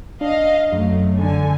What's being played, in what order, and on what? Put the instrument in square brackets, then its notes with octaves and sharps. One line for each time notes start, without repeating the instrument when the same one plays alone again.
[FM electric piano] D4 [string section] D#5 F5
[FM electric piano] F#2 [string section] F#3 A3
[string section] D3 G#5